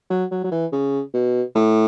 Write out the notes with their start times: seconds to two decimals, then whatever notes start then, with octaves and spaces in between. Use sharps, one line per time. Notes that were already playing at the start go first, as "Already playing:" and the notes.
0.10 F#3
0.31 F#3
0.44 F#3
0.52 E3
0.72 C#3
1.14 B2
1.55 A2